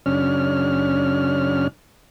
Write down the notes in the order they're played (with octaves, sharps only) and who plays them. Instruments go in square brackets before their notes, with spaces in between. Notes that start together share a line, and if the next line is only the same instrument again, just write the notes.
[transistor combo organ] F#2 C#3 C#4 D4 F6